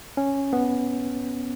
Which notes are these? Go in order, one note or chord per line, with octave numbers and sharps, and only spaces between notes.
C#4
B3